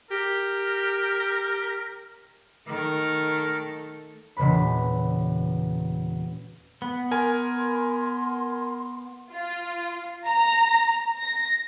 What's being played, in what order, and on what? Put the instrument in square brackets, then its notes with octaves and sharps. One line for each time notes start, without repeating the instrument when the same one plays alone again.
[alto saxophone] G4 [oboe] A#4
[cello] D#3 [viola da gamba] A3 A4 [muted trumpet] A#4
[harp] E1 A#2 C#3 B4 B5
[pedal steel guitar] B3
[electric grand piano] A#4 G#5 [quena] C6
[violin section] F4
A#5
A#6